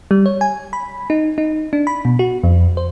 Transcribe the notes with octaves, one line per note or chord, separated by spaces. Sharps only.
G3
C#5
G#5
B5
D#4
D#4
D4
B5
B2
F#4
F2
C5